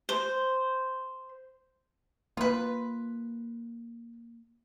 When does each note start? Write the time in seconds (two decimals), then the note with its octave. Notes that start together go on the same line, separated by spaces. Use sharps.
0.09 C5
2.37 A#3 F4 B4